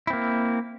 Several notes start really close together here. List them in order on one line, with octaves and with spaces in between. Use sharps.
E4 C4 A#3